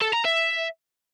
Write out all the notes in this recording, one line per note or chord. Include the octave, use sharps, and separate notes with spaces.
A4
A#5
E5